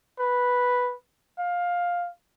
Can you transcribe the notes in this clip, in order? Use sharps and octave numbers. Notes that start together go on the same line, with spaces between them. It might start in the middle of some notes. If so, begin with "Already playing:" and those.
B4
F5